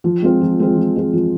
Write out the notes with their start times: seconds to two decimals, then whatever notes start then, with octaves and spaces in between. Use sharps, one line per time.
0.04 F3
0.22 G#3 C4 F4
0.41 F3
0.60 G#3 C4 F4
0.77 F3
0.96 G#3 C4 F4
1.13 F3